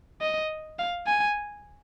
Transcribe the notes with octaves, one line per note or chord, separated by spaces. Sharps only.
D#5
F5
G#5